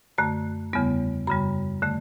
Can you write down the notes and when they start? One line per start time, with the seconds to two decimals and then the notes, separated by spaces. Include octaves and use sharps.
0.18 F#2 D3 A3 A5
0.73 E2 C#3 G3 B3
1.27 F#2 C#3 G3 B5
1.82 D3 A3